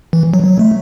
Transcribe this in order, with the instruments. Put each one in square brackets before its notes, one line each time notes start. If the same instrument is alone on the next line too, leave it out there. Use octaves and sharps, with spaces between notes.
[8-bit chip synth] E3
F#3
F#3
A3